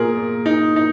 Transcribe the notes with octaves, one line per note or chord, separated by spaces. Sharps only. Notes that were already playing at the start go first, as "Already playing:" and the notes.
Already playing: A#2 G#4 A#4
D#4
D#4